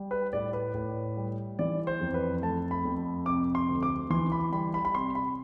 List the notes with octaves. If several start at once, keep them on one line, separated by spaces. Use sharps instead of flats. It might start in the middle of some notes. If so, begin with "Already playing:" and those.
Already playing: G3
B4
A2 D5
B4
A2
G3
E3 D5
C5
F2
B4
A3 A5
B5
F2
C3 D6
C6
D2
D6
E3 C6
B5
G3 B5
B5
B5
C3 C6
B5